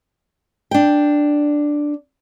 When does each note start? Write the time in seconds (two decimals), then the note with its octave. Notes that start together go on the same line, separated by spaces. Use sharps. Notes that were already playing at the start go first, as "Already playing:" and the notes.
0.71 D4 G5